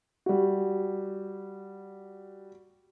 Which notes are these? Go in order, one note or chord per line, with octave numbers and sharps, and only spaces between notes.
G3 F#4